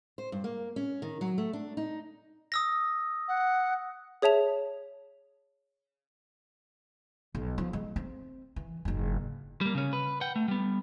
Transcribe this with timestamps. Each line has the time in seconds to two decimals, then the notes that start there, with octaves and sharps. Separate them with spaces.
0.18 C5
0.32 G2
0.44 A#3
0.76 C#4
1.02 D#3
1.21 F#3
1.38 A3
1.53 D4
1.77 D#4
2.52 D#6 E6 A#6
3.28 F#5
4.22 G#4 C#5 E5 A5 F7
7.35 B1
7.58 F3
7.73 G#3
7.96 C4
8.56 E3
8.85 F#1 G#2
9.61 G3 A#3
9.75 C#3 C#4
9.93 B4
10.21 F#5 G5
10.36 A3
10.48 G3 B3